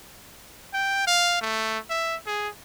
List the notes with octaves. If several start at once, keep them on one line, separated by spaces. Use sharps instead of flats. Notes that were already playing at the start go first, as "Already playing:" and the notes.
G5
F5
A3
E5
G#4